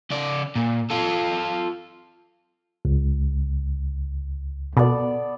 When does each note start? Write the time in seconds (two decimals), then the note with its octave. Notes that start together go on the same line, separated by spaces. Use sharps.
0.10 C#3 D5
0.56 A#2
0.91 F4 A4
2.85 C#2
4.77 B2 B3 A4 D5